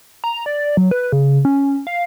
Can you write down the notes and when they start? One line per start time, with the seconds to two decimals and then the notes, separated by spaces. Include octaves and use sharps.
0.24 A#5
0.46 D5
0.77 F#3
0.91 B4
1.12 C#3
1.45 C#4
1.87 F5